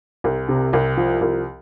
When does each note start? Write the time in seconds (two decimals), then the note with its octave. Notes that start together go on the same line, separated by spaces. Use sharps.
0.24 C2
0.48 C3
0.73 C2
0.97 F3
1.21 C2